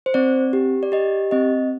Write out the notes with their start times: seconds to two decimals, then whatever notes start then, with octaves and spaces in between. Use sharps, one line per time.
0.06 C5
0.14 C4 D5
0.53 G4
0.83 D5
0.92 G4 D#5
1.31 C4 D#5